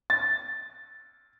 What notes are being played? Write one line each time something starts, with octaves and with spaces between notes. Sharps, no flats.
A6